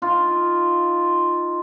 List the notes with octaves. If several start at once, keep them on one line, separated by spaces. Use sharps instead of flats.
D#4 F4